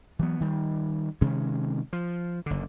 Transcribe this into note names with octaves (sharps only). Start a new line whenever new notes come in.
E3 F#3 B3
D#3 G3
C3 D#3 G#3 C#4
F3
F#1 D3